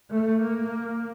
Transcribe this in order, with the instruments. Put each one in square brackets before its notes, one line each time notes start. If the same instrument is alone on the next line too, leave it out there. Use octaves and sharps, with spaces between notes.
[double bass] A3
A#3